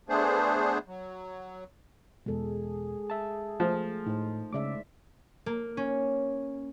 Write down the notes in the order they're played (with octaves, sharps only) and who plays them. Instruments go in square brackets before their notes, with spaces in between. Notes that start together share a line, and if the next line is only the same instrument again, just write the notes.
[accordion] A3 B3 D4 G#4 C5
F#3
[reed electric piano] E2 B2 [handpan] G#3 A4 [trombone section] G#4
[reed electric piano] E5 A5
[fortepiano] F3 [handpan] A3
[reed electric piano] A2 [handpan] D#4 C5
[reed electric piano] C#3 D6 [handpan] G#3 D5 E5
[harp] A#3
C#4